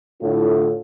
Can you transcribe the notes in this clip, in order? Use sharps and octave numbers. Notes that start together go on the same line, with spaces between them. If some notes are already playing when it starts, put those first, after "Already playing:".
A2 D3 D4 E4 F4 A4